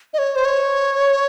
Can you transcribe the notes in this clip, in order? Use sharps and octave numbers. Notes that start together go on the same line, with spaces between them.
D#5
C#5
C5
C#5